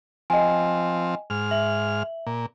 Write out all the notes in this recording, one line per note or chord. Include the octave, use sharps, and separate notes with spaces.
F3 C4 D#5 G5 G#5
G#2 F6
E5 F#7
A#2